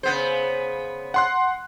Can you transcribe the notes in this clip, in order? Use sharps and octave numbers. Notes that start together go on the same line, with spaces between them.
C#3 B3 C5
F#5 C6 F#6